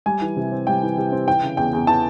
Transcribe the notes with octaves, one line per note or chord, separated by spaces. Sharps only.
G3 G#5
E3
C3
C4
G3 G5
E3
C3
C4
E3 G5
C#3
E2 G5
E2
E3 A5